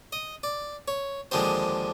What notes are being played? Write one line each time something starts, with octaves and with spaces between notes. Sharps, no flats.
D#5
D5
C#5
D#2 D3 F3 G#3 C5